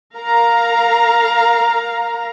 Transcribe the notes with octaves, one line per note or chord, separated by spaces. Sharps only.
A#4 F5 A#5